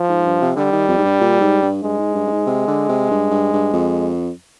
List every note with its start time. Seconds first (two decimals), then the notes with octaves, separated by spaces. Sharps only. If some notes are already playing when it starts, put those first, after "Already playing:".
Already playing: F3
0.09 G#2
0.26 G2
0.42 C3
0.56 D3 G3
0.72 D#3
0.89 F2
0.98 G#2
1.05 G2
1.21 A#2
1.41 G#2
1.62 G2
1.83 G2 G#3
1.99 G#2
2.15 G2
2.26 G2
2.32 G#2
2.47 C3
2.67 D3
2.89 C3
3.11 G2
3.31 G2
3.53 G2
3.74 F2